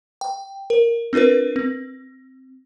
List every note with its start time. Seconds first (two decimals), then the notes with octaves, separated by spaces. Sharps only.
0.21 G5
0.70 A#4
1.13 C4 D4 F4 A#4 B4
1.56 C4